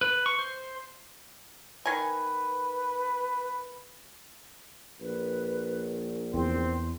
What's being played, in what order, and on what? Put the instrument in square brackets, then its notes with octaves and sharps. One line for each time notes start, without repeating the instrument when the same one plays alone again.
[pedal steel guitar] B4
C#6
C5
[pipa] D#3 G#5 [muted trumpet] B4
[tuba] A#1 [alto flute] B4
[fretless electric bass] E2 [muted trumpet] C4 [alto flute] C6